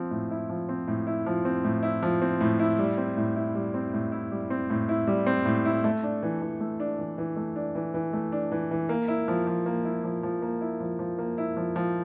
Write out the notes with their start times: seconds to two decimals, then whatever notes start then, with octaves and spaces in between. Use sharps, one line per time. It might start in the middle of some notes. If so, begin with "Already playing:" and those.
Already playing: F3 C4
0.11 A2
0.31 E4
0.50 F3
0.69 C4
0.88 A2
1.07 E4
1.26 F3
1.45 C4
1.64 A2
1.83 E4
2.03 F3
2.22 C4
2.41 A2
2.59 E4
2.79 G3
2.98 C4
3.17 A2
3.36 E4
3.55 G3
3.74 C4
3.94 A2
4.12 E4
4.32 G3
4.50 C4
4.70 A2
4.89 E4
5.07 G3
5.26 C4
5.45 A2
5.65 E4
5.84 A3
6.03 D4
6.23 E3
6.41 E3
6.60 A3
6.80 D4
6.99 E3
7.18 E3
7.36 A3
7.56 D4
7.75 E3
7.94 E3
8.13 A3
8.32 D4
8.52 E3
8.71 E3
8.89 A#3
9.08 E4
9.28 F3
9.47 F3
9.66 A#3
9.85 E4
10.04 F3
10.23 F3
10.42 A#3
10.61 E4
10.80 F3
10.99 F3
11.19 A#3
11.38 E4
11.57 F3
11.76 F3